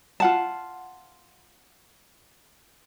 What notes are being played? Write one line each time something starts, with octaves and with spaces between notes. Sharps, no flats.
F4 F#5 A5